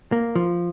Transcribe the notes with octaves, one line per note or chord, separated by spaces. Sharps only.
A#3
F3